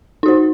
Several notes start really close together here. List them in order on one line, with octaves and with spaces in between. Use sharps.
D#4 F#4 C5